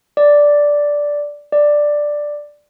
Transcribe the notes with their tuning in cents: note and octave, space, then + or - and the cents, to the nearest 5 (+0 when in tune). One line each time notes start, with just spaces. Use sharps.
D5 -5
D5 +5